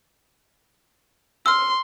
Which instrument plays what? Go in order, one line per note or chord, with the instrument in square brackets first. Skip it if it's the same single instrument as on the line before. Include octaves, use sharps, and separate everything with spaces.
[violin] C6 [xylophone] E6 F6